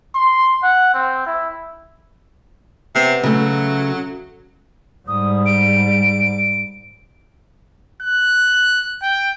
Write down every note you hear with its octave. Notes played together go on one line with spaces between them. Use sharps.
C6
F#5
C4
E4
C3 B3
C#3 F#3 A3
G#2 G3 D#6
D7
F#6
G5